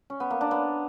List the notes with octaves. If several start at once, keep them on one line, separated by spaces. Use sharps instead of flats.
C#4
B3
A#3
D4
B3